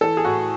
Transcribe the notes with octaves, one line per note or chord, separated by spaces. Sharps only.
E3 A4
G#4
A2 F#4